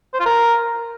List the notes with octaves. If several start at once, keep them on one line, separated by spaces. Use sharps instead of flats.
C5
F4
A#4